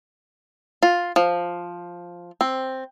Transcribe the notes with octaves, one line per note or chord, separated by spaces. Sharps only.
F4
F3
C4